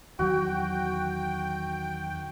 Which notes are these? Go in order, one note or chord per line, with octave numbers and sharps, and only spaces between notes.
E2 D#3 F#3 F#4 G5